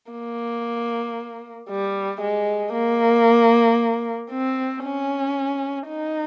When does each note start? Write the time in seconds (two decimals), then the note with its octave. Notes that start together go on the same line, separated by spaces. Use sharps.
0.12 A#3
1.69 G3
2.21 G#3
2.73 A#3
4.31 C4
4.84 C#4
5.88 D#4